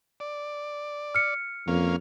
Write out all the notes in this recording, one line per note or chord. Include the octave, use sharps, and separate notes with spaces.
D5
F6 C#7
F2 A#3 C#4 F5